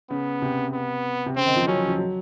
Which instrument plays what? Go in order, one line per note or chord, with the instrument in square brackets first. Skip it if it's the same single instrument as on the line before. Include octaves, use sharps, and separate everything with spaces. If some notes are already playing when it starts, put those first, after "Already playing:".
[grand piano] C#3 [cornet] B3
[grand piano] C3
[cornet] B3
[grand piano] C3
[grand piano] C#3 [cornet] C4
[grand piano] D#3
F3
[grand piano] F#3 [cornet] C#4
[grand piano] F3
F#3